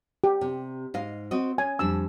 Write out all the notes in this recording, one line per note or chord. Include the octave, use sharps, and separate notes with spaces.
G4
C3
G#2 D#5 F5
C4 F#4 D#5
C#4 G#5
F2 G3 D4 E6